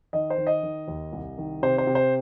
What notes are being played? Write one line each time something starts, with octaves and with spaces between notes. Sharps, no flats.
D#3 D#5
C5
D#3
D#5
D#3
D#2
C2
D#3
C3 C5
C5
C3
C5